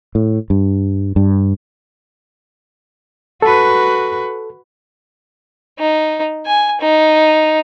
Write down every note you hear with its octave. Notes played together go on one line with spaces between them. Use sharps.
A2
G2
G2
F#4 A4 B4
D#4
G#5
D#4